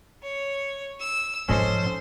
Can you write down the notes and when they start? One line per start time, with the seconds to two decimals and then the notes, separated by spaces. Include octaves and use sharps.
0.23 C#5
1.00 E6
1.48 G#2 F3 C#4 A4 C5 D#5